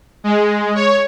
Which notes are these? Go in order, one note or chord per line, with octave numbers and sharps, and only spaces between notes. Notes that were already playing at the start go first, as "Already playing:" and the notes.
G#3
C#5